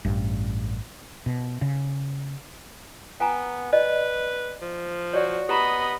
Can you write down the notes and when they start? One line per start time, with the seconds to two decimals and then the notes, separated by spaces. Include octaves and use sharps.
0.05 A1 G2
1.26 B2
1.62 C#3
3.20 B3 G5 G#5 A#5
3.73 B4 D5 D#5
4.62 F3
5.13 F#4 C#5 D5
5.49 B3 G4 D#5 A#5 B5